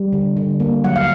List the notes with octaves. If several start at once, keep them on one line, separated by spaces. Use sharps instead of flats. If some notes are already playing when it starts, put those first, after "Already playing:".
Already playing: G3
D3
D3
A#3
F#3 F#5
F5